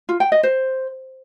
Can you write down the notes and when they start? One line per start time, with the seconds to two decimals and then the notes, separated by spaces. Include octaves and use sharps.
0.09 F4
0.20 G5
0.32 D#5
0.43 C5